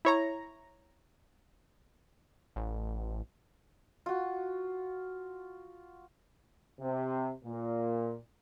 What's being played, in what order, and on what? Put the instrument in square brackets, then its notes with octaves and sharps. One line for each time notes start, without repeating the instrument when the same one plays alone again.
[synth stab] E4 C#5 A#5
[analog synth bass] A1
[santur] F4 F#4
[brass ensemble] C3
A#2